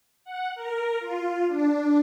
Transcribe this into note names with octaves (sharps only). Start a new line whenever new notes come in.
F#5
A#4
F4
D4